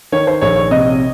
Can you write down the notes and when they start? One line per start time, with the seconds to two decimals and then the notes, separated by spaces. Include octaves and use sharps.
0.12 D#3 C#5
0.27 C5
0.41 A#1 C#5
0.56 C#5
0.71 C3 D#5